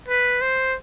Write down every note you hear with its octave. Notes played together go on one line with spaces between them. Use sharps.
B4
C5